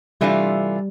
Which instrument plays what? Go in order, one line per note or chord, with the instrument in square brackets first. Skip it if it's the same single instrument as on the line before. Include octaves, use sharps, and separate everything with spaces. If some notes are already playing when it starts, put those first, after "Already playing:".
[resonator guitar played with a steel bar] C3 E3 A3 D4 F4 [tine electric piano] G3